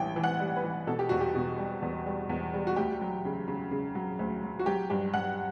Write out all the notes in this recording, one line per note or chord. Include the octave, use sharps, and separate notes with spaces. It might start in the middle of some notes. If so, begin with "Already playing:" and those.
Already playing: A1 G2 E3 G5
E3
F#5
G3
B4
E3
B2 A4
G4
E2 F#4
G4
B2
G3
E2
G3
E2
G3
F#4
D2 G4
F#3
C#3
C#3
C#3
F#3
D2
F#3
F#4
F#3 G4
G2 G4
G2 F#5